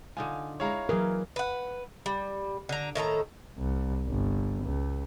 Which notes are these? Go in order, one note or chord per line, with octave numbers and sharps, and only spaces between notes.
D3 D#4 F4 G#5
G#3 E4 C#5 F5 A#5
E3 F#3 G#4 A#4 F5
B4 F#5
G3
D3 A#5
A2 D#3 A4 A#5
C2
G1
C#2